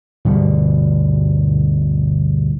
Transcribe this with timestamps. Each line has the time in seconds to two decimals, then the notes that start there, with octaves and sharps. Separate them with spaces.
0.25 D2 G2 B2 G3